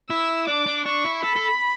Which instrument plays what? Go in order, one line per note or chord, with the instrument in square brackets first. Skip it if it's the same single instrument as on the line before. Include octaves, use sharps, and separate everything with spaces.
[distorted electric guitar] E4 [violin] E6
[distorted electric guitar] D4 [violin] D6
[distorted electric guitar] D4
[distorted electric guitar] D4 [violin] C#6
[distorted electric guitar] E4
[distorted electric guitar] A4 [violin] B5
[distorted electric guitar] A4